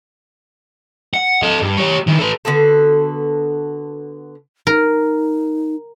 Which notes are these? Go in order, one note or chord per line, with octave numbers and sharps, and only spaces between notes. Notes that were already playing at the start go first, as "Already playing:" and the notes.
F#5
A4 D#5
G2
G4 C#5
D#3 E4
A4 B4
D3 B3 F#4 A4
D#4 A#4